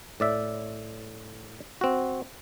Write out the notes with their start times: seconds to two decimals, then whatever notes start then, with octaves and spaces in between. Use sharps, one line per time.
0.20 A2 D5 E5
1.81 C4 F#4